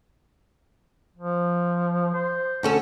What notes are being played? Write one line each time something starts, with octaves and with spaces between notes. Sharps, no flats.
F3
C5
D2 C#4 A4